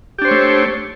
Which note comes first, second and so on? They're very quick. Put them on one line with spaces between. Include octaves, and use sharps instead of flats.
G4 D4 C5 C#5 A3